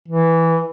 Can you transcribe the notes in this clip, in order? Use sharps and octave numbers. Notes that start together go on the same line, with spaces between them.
E3